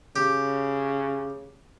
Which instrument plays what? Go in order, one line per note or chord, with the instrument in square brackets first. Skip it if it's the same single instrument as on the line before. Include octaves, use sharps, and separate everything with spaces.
[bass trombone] C#3 [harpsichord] G4